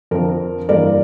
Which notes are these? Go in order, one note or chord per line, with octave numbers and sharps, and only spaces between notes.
F2 D3 F3 A#4
G2 E3 G3 A#3 A#4 D5